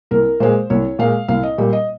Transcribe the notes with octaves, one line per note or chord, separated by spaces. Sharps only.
C2 A#4
A#2 G#3 C5
C2 C#5
A#2 G#3 F5
C2 F5
D#5
A#2 G3
D#5